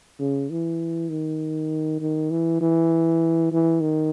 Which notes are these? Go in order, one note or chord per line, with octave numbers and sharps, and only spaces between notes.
C#3
E3
D#3
D#3
E3
E3
E3
D#3